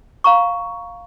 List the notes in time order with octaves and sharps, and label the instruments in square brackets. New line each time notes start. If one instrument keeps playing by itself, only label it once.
[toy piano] F5 A#5 C#6